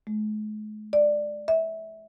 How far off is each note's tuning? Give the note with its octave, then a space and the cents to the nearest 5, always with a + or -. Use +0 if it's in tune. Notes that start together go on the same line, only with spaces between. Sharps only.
G#3 +45
D5 +10
E5 -20